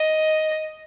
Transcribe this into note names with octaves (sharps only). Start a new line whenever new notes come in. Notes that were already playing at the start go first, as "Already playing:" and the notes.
Already playing: D#5